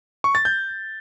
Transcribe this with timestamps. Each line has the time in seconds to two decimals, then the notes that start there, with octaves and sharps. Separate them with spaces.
0.24 C#6
0.35 A6
0.45 G6